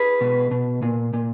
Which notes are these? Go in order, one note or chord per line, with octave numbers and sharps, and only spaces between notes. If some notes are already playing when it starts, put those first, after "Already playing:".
Already playing: G#4 B4
B2
B2
A#2
A#2